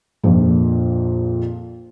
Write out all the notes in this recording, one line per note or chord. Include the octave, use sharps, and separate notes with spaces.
A#1 F2 A#2